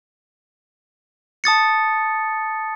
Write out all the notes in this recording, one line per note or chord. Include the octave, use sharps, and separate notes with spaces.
A5 D#6 A6 C#7